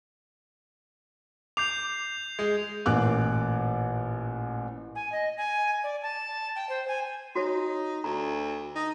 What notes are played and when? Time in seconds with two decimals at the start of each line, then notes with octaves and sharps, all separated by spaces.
1.57 D6 G6 C7 F7
2.39 G#3
2.86 A1 A#2 D6 F#6
4.95 G#5
5.12 D#5
5.37 G#5
5.84 D5
6.02 A5
6.55 G5
6.69 C5
6.88 G#5
7.36 D#4 F#4 C#5
8.04 D2 A#5
8.76 D#4